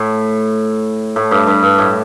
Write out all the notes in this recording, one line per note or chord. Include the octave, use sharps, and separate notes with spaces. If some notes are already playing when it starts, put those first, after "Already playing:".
Already playing: A2
A2
G2
G2
G2
A2